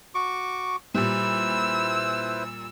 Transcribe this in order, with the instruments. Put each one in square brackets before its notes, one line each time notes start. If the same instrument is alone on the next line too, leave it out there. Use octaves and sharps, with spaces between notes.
[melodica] F#4 C#6 D6
[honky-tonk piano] A#2 G3 [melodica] E4 B4 C5 [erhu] E6